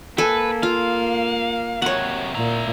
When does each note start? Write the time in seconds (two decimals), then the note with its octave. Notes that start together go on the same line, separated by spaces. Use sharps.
0.18 A#3 A4 B4 G#5
0.63 F4 F5
1.82 C3 F#3 C#5 F#5
2.35 A#2 E4 A#5